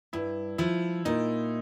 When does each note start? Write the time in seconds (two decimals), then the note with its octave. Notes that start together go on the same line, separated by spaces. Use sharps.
0.13 G2 E4
0.58 F3 E4
1.05 A#2 D#4